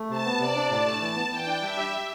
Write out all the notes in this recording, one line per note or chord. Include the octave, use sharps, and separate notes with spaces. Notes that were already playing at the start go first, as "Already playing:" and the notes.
Already playing: A3
C3 A5
B3
C3 D5
D4
A2 A5
A3
E3
B3
E3 G5
D4
G3 E5
G4